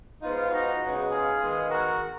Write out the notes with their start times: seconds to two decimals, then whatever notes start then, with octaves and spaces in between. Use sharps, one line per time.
0.22 G#2 F3 B3 D#4 F4
0.52 D#4 F#4
0.82 C#3 G#3 B3 D#4
1.11 F4 G#4
1.41 D#3 G#3 B3
1.70 F#4 A#4